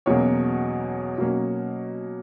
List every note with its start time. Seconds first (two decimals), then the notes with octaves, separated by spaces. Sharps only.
0.06 E2 B2 F#3 A#3 C#4 C#5
1.18 B2 F#3 A#3 C#4